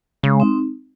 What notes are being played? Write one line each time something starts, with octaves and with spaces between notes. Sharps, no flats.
C#3 G#3
C4 D#4